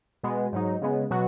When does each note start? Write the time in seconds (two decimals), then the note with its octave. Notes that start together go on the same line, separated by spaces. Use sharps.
0.23 B2 G#3 B3
0.52 G#2 F#3 D#4
0.82 C#3 G#3 B3
1.10 B2 F#3 B3 F#4